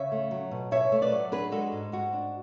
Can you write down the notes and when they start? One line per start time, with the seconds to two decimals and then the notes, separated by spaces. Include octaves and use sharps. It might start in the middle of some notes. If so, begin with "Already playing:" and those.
Already playing: C#3 C#5 E5
0.12 A3
0.31 F#3
0.51 B2
0.71 B2 C#5 E5
0.92 A3
1.02 B4 D5
1.12 F#3
1.32 D4 G#4 B4
1.52 G#3 F#4 A4
1.72 G#2
1.92 G#2 F#4
2.13 D4